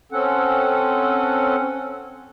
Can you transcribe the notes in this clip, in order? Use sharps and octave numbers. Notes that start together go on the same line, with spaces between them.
C4 C#4 A4 F#5